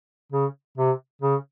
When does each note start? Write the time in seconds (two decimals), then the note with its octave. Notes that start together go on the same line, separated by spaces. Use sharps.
0.32 C#3
0.78 C3
1.22 C#3